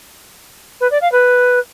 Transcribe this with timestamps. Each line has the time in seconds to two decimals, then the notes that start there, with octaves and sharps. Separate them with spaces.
0.80 B4
0.91 D5
1.01 F5
1.12 B4